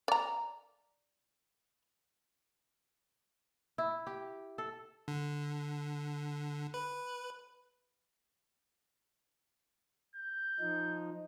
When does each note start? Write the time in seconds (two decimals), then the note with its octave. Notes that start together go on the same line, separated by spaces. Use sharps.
0.08 D5 A#5
3.78 E4
4.07 G4
4.58 A4
5.08 D3
6.74 B4
10.16 G6
10.60 F3 D#4